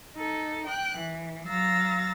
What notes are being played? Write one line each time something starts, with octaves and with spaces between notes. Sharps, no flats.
D#4 A4
G5 F#6
E3
F#3 F5 A#5 E6 A6 A#6